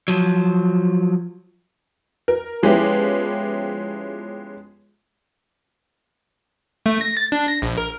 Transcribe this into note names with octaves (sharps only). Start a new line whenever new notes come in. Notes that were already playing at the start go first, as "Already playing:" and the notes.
F3 F#3
A#4
F3 G#3 B3 C#4 E4 G4
A3
A#6
A6
D4
A#6
A#1
A#4